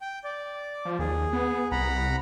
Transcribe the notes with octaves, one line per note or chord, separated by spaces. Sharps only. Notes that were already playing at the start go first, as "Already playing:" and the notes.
G5
D5
F3
D#2 G#4
B3
C2 F#5 A#5 B5